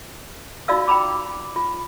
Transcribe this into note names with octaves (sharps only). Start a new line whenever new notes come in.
D#4 F4 F#4 D5 F5 E6
G5 A#5 B5 D6
F4